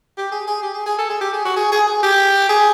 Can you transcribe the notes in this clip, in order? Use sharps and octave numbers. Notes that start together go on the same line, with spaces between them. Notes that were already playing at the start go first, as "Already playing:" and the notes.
G4
G#4
G#4
G4
G#4
G#4
A4
G#4
G4
G#4
F#4
G#4
G#4
G#4
G4
G#4